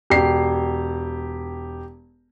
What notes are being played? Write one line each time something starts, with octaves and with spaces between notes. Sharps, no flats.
E1 G4 C7